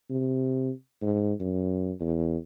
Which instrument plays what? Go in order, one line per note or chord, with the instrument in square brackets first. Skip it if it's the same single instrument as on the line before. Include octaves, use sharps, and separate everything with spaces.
[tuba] C3
G#2
F#2
E2